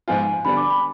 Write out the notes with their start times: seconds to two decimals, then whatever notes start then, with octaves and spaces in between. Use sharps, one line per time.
0.08 G#2 F3 G#3 B3 F4 G#5
0.45 D3 G3 B3 D4 B5
0.57 D6
0.70 B5